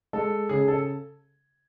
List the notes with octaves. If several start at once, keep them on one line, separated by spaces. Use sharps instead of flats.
G#3 A4
C#3 G#4
A4